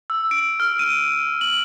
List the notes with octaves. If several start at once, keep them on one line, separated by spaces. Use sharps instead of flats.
E6
D7
F6
D#7
F#7